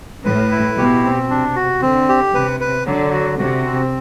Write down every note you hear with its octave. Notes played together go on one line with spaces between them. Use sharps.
A2 B4
E4
B2 G4
C4
C3 D4
F#4
D3 C4
G4
C3 B4
B4
D3 F#3
F#4
C3 F#4
C4